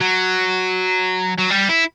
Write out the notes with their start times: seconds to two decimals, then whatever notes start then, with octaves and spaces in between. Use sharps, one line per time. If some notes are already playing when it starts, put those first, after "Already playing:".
0.01 F#3
1.38 F#3
1.50 G3
1.69 E4